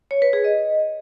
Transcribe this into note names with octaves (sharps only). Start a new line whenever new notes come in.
C#5
B4
G#4
D#5